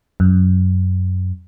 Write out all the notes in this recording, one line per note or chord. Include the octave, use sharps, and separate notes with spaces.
F#2